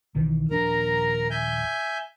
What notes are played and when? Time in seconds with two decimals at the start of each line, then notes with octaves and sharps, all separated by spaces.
0.15 B1 D#3 E3
0.50 D#1 F3 D4 A#4 A#5
1.30 E5 G#5 G6